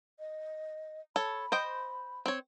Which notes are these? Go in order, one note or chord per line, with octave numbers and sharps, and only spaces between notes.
D#5
A4 C#5 B5
C5 D#5 G5
C4 C#5